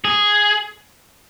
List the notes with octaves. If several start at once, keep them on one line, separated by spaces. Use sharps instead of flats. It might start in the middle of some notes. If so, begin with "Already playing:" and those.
G#4